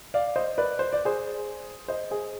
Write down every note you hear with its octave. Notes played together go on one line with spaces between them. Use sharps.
D5 F5
C5 D#5
B4 D5
C5
D5
G#4 C5
C5 D#5
G#4 C5